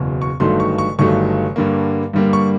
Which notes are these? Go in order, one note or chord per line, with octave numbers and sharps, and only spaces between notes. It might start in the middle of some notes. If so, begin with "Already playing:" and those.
Already playing: F#1 E2 B2 F#3
C#6
G1 G2 D#3 F#3 A3 C6
C#6
C#6
G1 G2 D#3 F#3 A3 C#6
G2 D3 G3 A#3
G2 D3 G3 A#3
C#6